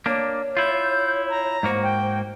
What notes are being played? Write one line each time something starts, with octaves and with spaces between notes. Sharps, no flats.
A#3 D4 C#5
E4 F4 G6
A#5
G#2 A#3 F#4 C5
G5